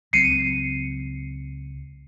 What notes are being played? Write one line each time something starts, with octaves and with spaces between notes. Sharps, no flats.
C#2 F#3 C4 C7 C#7 D#7